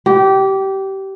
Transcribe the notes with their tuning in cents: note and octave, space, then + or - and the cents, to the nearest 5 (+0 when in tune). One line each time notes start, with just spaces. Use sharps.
G4 -20